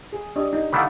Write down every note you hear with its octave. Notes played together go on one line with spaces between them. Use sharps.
G#4
D4 G4 D#5
D#4
D#3 E3 A3 F5 F#5 B5